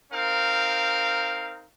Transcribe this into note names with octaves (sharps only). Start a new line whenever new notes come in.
C4 D#4 A#4 F5